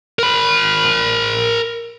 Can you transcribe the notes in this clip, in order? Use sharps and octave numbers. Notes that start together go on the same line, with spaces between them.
A#4 B5